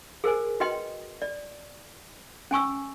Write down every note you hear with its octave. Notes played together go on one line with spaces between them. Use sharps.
G#4 A#4 C5 G#5
F#4 B4 D#5 G5 C6
D5
C#4 G#5 C#6 E6